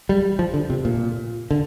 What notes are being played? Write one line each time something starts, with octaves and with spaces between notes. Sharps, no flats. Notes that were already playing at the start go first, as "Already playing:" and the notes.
G3
F3
D3
C3
A#2
D3